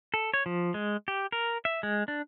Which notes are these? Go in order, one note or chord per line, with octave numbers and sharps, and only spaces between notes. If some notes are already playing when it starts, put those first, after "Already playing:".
A4
C#5
F3
G#3
G4
A#4
E5
G#3
D4